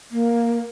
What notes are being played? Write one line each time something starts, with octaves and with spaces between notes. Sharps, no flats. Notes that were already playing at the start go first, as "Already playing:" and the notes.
A#3